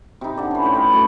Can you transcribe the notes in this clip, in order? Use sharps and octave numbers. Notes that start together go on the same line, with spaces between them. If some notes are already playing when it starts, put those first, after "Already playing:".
C3 D#4
D3 D5
E3 C#4
A2 C5 G5
B4 D#5 F5
F#2 A3 D5